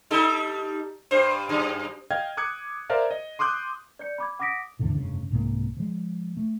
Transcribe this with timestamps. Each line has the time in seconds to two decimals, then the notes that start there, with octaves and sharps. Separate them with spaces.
0.11 G3 D#4 A4
1.11 G2 C5
1.49 F#2
2.10 D#5 F5 G5 G#6
2.37 D6 D#6 F#6 G#6 C#7
2.90 A#4 C5 D5 E5 F5
3.11 D#5
3.39 C6 D6 D#6 F#6 G6
3.99 D5 G6 C#7
4.18 B5 D6 G#6
4.39 F#5 D6 D#6 A#6 B6 D7
4.79 D2 G#2 D3 E3
4.93 F1 G2 C#3
5.31 C2 G#2 F#3 A#3
5.77 F3 G#3
6.37 A3